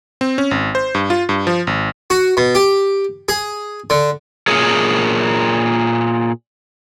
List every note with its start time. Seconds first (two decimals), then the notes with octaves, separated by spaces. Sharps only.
0.21 C4
0.38 C#4
0.51 G#1
0.75 C5
0.95 G2
1.10 F4
1.29 G2
1.47 F3
1.67 G#1
2.10 F#4
2.37 B2
2.55 G4
3.29 G#4
3.90 D3
4.48 A#2 G#4 A#4 C#5